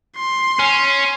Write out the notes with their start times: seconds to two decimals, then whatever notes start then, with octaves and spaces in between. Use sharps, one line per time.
0.17 C6
0.59 C#4